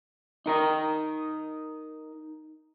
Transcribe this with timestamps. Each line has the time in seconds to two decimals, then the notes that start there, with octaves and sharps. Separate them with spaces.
0.46 D#4 A#4 D#5